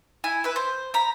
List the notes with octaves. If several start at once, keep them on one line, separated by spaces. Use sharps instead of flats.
E4 G#5
B4 E5
C5
A#5 B5